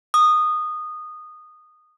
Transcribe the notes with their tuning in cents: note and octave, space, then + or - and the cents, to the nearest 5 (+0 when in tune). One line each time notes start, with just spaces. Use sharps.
D#6 -15